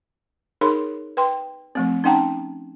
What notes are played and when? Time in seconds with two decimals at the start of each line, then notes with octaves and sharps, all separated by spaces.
0.61 D#4 G#4 A#4 C#5 B5 C6
1.17 B4 G5 C6
1.75 F3 A3 C4
2.04 C#4 D#4 F#5 G5 A5 A#5